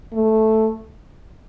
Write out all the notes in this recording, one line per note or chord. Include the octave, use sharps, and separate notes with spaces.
A3